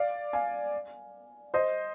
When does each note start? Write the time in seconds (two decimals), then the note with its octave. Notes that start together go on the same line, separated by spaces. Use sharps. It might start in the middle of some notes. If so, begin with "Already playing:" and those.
Already playing: D5 F5
0.33 F5 G#5
1.54 C5 D#5